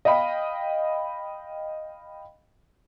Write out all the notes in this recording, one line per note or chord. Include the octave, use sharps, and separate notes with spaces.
D#5 F5 G5 B5